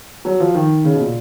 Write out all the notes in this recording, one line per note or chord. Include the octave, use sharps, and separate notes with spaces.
F#3
F3
D#3
C#3
B2
A#2